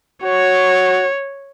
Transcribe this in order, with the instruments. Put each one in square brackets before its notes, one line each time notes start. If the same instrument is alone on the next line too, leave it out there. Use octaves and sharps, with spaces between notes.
[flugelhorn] F#4 [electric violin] C#5